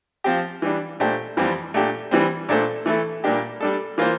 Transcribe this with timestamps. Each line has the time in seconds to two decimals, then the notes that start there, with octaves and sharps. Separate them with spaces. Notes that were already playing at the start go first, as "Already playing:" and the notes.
0.24 F3 C4 G4
0.62 E3 G3 D4
1.00 A#2 A3 D4 G4 C5
1.37 F2 E3 G3 C4
1.74 A#2 A3 D4 G4
2.11 E3 G3 C4
2.49 A#2 A3 D4 A4 C5
2.86 E3 A3 E4 A4
3.24 A#2 G3 A#3 D4 G4
3.61 G3 D4 A4
3.98 E3 A#3 F4 C5